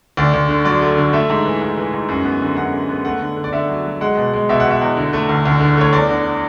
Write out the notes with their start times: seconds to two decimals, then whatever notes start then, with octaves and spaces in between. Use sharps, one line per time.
0.17 D2 D5
0.33 D2
0.49 D3
0.65 F#3 D5
0.81 A3
0.97 D3
1.13 A3 E5
1.30 G#2
1.45 E3
1.61 G#2
1.78 E3
1.94 G#2
2.09 F#2
2.25 B3
2.41 D3
2.57 F#2 F#5
2.73 D3
2.89 B3
3.05 A3 F#5
3.21 D3
3.36 D3
3.44 D5
3.53 D3 E5
3.69 F#3
3.86 F#3
4.01 G#3 F#5
4.17 B2
4.33 G#3
4.49 B2 E5
4.60 F#5
4.65 B2
4.71 E5
4.81 E2
4.97 D3
5.13 A3
5.29 D2
5.45 D2
5.60 D3
5.77 A3 C#5
5.93 E2 D5
6.10 D3